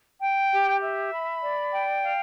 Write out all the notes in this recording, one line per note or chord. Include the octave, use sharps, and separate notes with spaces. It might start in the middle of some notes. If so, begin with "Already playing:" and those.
G5
G4
E5
B5
D5
G5
F5